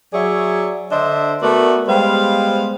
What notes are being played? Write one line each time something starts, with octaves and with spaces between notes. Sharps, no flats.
F#3 G#4 C#5 D5 E5
D3 D4 C5 D#5 E5
A3 B3 F#4 A#4 D5
G3 G#3 B3 C5 F5